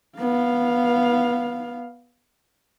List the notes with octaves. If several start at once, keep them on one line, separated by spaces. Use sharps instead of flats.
B3 F5